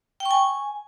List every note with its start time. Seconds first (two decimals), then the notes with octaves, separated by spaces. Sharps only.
0.20 G5
0.25 C#6
0.31 G#5